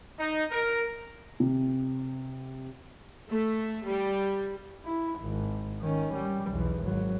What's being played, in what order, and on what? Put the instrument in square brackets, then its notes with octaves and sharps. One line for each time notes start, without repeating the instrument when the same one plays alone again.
[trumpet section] D#4
A#4
[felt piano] C3
[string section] A3
G3
[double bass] E4
G#1
D#3 C#4
G3
B1 E2
G#1 F#3